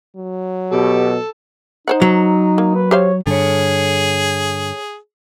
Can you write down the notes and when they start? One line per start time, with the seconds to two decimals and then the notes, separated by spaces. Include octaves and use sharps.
0.16 F#3
0.72 B2 G4 A4
1.88 D#4 C5 C#5 F#5
2.02 F#3
2.58 A#3
2.75 B4
2.91 G4 C5 C#5 F5
3.27 G2 D3 G#4 A4 C#5